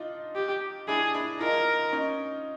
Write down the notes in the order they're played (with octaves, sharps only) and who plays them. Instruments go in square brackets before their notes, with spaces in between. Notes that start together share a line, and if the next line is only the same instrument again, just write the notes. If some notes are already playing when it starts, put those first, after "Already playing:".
Already playing: [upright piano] D4 D#4 F4
[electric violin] G4
[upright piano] D4 E4 [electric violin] G#4
[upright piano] D4 E4
[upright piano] D#4 F4 [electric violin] A#4
[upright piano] C#4 D#4